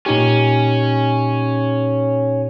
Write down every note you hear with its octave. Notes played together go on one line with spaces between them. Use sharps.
A#2 C#4 D#4 G4